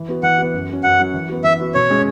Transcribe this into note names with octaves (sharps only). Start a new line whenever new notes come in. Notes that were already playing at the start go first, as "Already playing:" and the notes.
Already playing: E3
B3 F#4
E3 F#5
B3 F#4
F#2
F#3 C#4
F#2 F#5
F#3 C#4
E3
B3 F#4
E3 E5
B3 F#4
B2 C#5
G#3 C#4